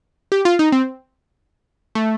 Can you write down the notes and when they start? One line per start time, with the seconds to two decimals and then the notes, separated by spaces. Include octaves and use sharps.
0.32 G4
0.45 F4
0.59 D#4
0.72 C4
1.95 A3